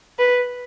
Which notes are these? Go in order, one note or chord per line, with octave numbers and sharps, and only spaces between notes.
B4